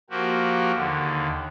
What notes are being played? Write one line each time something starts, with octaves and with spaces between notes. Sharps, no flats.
F3 A#3 F#4 G4
D#2 D3